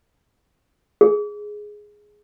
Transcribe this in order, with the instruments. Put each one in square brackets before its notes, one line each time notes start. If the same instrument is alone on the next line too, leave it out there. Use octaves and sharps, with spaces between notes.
[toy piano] G#4